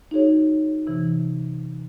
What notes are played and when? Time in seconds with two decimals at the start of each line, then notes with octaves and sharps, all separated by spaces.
0.11 D#4 F#4 G#4 C#5
0.87 C3 E3